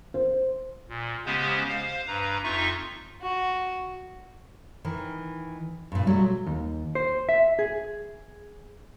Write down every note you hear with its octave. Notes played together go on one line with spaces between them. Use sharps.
C5
A#2
C#3 G#3 B3 C#4 G4 C5
C5 F5
G2 B4 A#5
F2 D#4 F4 E5 C#6
F#4
D#3 E3
G2 A#2
B2 F#3 G3 A3
D#2
C5
E5
G#4